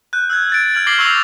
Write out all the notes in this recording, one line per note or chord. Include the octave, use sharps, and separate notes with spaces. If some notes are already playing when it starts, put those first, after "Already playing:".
F#6 G6
E6 F#6 G#6
F#6 A6 D7
F6 G#6 D7 F#7
D6 F6 A#6 C7 F#7 G7
C#6 D6 E6 G6 A#6 F7